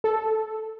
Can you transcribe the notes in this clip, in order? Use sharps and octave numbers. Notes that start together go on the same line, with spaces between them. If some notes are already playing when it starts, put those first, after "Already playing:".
A4